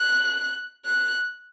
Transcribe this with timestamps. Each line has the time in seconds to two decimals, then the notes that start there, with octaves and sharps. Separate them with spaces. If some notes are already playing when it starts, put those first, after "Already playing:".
Already playing: F#6
0.85 F#6